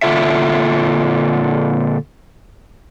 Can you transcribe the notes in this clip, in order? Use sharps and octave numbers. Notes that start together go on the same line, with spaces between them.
A#2 D3 F4 A4 E5